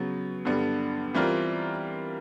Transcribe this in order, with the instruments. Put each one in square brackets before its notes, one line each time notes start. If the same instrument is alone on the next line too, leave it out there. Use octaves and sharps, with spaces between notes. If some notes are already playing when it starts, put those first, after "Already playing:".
Already playing: [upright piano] C#3 F#3 B3
G2 D3 G3 B3
E3 G3 C4 F4 A#4